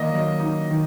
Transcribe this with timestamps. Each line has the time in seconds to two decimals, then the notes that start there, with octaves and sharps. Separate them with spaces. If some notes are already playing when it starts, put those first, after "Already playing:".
Already playing: D#3 A#3 D#5
0.09 F#3
0.40 D#4
0.69 D#3